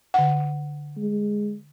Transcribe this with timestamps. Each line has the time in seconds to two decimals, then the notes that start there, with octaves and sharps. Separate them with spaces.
0.14 D3 F#5
0.97 G#3